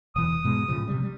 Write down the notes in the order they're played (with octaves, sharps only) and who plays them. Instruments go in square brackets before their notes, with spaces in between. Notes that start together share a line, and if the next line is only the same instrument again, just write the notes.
[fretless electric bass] E1 E3 [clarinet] D#6
[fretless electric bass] G#2 B2 G#3
A2 C#3 F3
C3 G3
G3